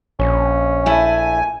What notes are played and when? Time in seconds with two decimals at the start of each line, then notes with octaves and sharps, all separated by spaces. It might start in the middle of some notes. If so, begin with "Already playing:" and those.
0.19 A#1 C#4
0.86 A3 E4 G#5 A5